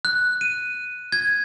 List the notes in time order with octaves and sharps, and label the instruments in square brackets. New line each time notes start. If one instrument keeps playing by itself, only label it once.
[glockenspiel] F#6
D#7
G#6